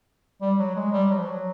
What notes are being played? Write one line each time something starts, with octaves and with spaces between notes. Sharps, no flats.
G3
F#3
G#3
G3
F#3
F3
F#3